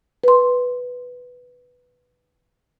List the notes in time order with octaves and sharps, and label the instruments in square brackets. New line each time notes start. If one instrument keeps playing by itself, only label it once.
[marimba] B4 C6